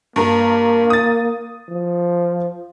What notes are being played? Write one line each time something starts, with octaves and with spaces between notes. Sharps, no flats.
G2 A#3 A#4
D#6 A6
F3